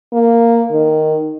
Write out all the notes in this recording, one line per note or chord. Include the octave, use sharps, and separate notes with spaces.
A#3
D#3